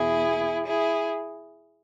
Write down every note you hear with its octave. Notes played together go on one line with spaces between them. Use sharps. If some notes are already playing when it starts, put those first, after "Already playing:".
Already playing: E2 B2 E4 G#4
E4 G#4